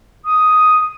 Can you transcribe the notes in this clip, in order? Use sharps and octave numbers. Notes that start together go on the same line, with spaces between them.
D#6